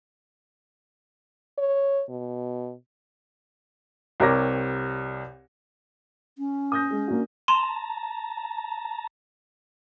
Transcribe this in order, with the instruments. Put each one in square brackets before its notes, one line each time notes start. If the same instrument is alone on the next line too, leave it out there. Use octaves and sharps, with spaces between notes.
[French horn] C#5
B2
[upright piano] C2 C3 A#4 C#5 D6 A#6
[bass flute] C#4
[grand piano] D#6 G6 A#6
G#3
A#3 D4 F#4
[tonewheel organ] A5 A#5 [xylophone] C6